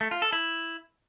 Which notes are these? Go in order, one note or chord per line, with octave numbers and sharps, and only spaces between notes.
A3
F4
A4
E4